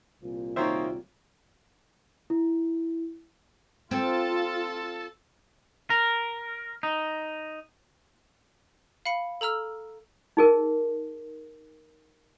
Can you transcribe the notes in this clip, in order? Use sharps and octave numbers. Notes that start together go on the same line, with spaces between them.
C2 A#2 F3
D#3 A#3 F#4 C5 C#5 E5
E4
C4 F4 A4 A5
A#4
D#4
F5 B5 C#7
A4 A#5 E6 F6
D#4 G#4 A#4